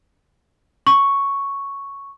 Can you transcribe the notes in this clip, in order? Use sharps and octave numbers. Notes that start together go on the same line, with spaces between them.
C#6